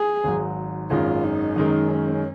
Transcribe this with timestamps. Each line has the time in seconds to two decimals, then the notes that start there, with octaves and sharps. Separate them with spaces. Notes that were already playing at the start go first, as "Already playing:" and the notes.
Already playing: G#4
0.24 G#1 G#2 F#3
0.90 G#1 F#2 D#3 G#3 F4
1.24 D#4
1.56 F#2 D#3 G#3
1.90 C#4